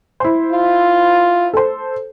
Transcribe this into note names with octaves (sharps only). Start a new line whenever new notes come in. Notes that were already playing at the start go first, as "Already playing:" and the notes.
E4 C5
F4
A4 C5